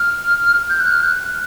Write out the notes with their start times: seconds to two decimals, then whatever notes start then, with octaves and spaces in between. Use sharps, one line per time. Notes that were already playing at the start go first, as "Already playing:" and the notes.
Already playing: F6
0.70 G6
0.80 F#6
0.91 F6
1.03 F#6